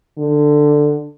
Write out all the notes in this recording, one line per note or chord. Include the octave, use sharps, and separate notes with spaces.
D3